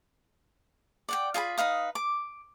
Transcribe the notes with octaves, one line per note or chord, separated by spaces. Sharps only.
D5 F#5 G5
F4 G#4 G#5 B5
D#4 B4 F5 D#6
D6